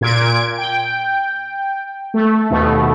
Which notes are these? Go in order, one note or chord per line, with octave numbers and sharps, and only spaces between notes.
A#2 G#6 D7
G5
A3
D#2 B2 A3